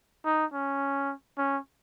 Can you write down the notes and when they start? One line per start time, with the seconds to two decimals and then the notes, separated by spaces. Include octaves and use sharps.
0.25 D#4
0.53 C#4
1.38 C#4